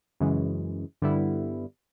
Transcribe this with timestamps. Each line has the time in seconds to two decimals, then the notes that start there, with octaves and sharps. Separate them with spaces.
0.20 F#2 C#3 E3 G#3
1.02 G2 D3 G3 B3 E4